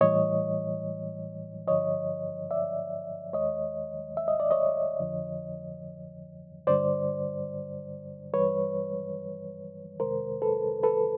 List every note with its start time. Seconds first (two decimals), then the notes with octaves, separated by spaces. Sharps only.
0.01 A2 E3 G3 C#5 D#5
1.67 G2 D3 F3 C#5 D#5
2.51 D5 E5
3.33 D#2 D#3 G#3 C#5 D#5
4.17 E5
4.28 D#5
4.40 D5
4.51 C#5 D#5
5.00 F2 D3 F3
6.67 G2 D3 G3 C5 D5
8.33 G2 E3 G3 B4 C#5
10.00 F2 C3 D#3 G#3 A#4 C5
10.42 A4 B4
10.83 A4 B4